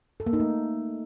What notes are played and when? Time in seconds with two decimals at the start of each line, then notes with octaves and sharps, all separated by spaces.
0.20 A4
0.26 A#3
0.33 D#4
0.40 A3